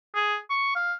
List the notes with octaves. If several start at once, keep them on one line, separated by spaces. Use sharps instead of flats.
G#4
C#6
F5